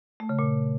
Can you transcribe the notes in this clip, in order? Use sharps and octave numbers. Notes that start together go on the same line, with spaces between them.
A3
C#3
A#2